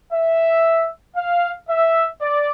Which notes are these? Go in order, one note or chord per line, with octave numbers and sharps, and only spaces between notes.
E5
F5
E5
D5